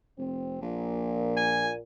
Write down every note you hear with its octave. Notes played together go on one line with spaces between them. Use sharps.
F1 C4
A#1 A#2
G#5